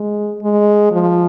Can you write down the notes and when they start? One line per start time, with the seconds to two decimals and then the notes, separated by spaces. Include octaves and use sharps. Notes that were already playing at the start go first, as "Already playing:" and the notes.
Already playing: G#3
0.42 G#3
0.91 F3